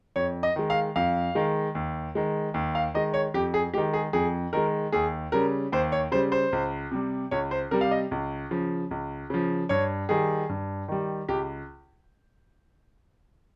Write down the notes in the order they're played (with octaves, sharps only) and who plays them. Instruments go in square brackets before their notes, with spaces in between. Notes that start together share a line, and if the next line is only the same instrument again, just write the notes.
[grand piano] F2 C#5
D#5
D#3 G#3
F5
F2 F5
D#3 G#3
D#2
D#3 G#3
D#2
F5
D#3 G#3 D#5
C#5
F2 G4
G#4
D#3 G#3 G4
G#4
F2 G#4
D#3 G#3 A#4
D#2 G#4
C#3 G3 A#4
D#2 C5
C#5
C#3 G3 C5
C5
C#2
C3 G3
C#2 C#5
C5
C3 G3 A#4
F5
D#5
C#2
C#3 F3
C#2
C#3 F3
G2 C#5
D#3 G3 G#4
G2
D#3 G3
C#2 G4